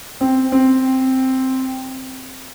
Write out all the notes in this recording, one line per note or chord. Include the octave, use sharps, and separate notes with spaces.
C4
C4